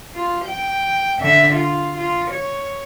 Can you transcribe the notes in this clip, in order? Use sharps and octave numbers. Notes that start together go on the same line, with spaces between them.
F4
G5
D3 E5
F4
F4
C#5